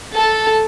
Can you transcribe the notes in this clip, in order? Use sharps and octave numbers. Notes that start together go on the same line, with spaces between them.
A4